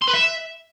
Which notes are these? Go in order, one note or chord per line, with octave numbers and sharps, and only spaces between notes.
C6
B4
E5